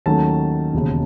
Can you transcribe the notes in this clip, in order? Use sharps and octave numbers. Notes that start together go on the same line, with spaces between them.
D#2 D#3 F#3 A3 C#4 A5
E1 D#2 C#3